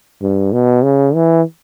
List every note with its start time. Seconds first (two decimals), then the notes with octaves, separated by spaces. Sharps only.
0.22 G2
0.52 B2
0.84 C#3
1.14 E3